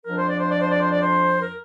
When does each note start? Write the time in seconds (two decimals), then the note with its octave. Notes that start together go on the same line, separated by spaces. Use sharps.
0.05 F2 F3 D4 A#4
0.17 C5
0.28 D5
0.39 C5
0.49 D5
0.60 C5
0.70 D5
0.80 C5
0.90 D5
1.00 C5
1.41 A#4